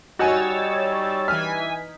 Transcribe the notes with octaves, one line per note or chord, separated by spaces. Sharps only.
G3 D#4 F#4 C#5 G#5 E6 A6
E3 G#5 F6 B6